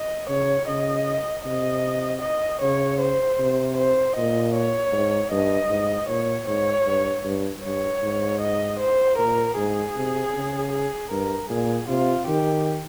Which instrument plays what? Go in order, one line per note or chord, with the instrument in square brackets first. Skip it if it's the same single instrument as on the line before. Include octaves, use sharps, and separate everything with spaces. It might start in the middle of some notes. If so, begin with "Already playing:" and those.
Already playing: [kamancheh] D#5
[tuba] C#3 [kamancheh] C#5
[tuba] C#3 [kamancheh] D#5
[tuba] C3 [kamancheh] D#5
[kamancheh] D#5
[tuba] C#3 [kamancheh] C#5
[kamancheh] C5
[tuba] C3
[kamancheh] C5
[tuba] A#2 [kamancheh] D#5
[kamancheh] C#5
[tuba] G#2
[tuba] G2 [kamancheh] D#5
[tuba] G#2
[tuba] A#2 [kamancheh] C#5
[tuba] G#2 [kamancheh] C#5
[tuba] G2
G2
[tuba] G2 [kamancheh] C#5
[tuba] G#2
[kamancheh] D#5
C5
[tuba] A#2 [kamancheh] A#4
[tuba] G#2 [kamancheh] G#4
[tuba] C3
C#3
[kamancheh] G#4
[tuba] G2 [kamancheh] A#4
[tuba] A#2 [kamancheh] G#4
[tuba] C3 [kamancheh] F4
[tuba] D#3 [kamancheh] G4